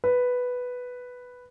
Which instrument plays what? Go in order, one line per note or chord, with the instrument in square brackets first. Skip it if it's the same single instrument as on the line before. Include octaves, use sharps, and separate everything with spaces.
[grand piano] B4